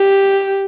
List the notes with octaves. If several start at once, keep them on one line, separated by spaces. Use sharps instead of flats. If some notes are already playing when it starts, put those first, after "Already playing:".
Already playing: G4